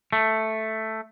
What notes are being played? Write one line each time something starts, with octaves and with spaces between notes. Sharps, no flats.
A3